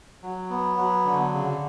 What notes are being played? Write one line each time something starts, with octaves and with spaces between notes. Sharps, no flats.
F#3
B3
F#3
D3
C#3